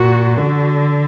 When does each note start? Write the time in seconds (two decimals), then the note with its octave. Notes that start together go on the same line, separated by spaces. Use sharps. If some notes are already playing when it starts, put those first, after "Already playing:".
Already playing: A#2 F#4
0.37 D3